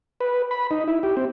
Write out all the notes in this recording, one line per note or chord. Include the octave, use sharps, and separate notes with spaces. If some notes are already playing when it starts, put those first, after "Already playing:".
B4
B5
D#4
E4
G4
C4